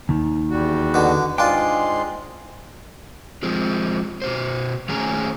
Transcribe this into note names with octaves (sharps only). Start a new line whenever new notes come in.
D#2 D#3
E2 G3 F#4
B2 D3
G#2 G#3 D4 F4 G5 G#5 C6
F3 G#3 C4
B2 F#4 C5
D#3 A3 C#4 G#4 C5 A#5